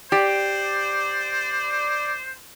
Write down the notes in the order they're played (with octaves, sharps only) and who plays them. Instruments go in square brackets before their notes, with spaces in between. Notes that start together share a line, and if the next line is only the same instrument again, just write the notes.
[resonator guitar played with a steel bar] G4 [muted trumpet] C5 [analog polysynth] D5